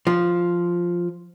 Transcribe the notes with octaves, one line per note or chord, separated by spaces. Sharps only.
F3